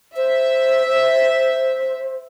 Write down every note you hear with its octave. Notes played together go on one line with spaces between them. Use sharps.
C5 E5